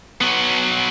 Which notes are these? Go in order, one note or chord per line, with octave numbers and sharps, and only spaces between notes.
F#3 B3